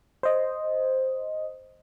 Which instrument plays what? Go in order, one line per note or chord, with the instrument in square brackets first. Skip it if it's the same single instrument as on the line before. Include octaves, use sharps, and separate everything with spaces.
[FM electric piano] C5 D#5